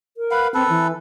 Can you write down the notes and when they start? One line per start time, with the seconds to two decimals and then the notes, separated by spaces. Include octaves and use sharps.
0.17 A#4
0.31 B4 F5 F#5
0.54 C4 A4 B4
0.69 E3